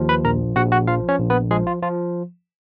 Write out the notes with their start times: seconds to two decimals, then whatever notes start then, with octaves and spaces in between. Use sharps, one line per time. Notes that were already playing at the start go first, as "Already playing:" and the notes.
Already playing: D#2 F3
0.09 B4 B5
0.24 A#1 A#4 A#5
0.56 A#1 F#4 F#5
0.72 F#4 F#5
0.87 F3 F4 F5
1.09 C#4 C#5
1.19 A#1
1.30 B3 B4
1.51 F3 G#3 G#4
1.67 F4
1.82 F3 F4